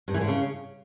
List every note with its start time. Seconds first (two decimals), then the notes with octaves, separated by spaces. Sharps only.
0.08 G2
0.14 E3
0.21 D3
0.28 C#3